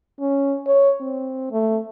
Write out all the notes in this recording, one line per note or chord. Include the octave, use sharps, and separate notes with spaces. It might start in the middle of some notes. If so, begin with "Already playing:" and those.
C#4
C#5
C4
A3